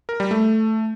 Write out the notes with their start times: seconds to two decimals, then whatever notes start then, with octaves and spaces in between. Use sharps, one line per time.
0.09 A#4
0.20 G3
0.31 A3